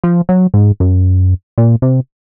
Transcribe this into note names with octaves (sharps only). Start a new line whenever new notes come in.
F3
F#3
G#2
F#2
A#2
C3